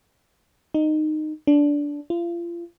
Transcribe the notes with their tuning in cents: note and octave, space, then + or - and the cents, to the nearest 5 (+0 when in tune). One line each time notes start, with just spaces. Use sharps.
D#4 -15
D4 -15
F4 -35